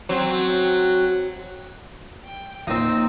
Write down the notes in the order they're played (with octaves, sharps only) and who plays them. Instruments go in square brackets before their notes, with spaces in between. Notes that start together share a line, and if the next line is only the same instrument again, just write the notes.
[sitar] F#3 C4
[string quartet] G5
[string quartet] A#2 [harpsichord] C4 D#4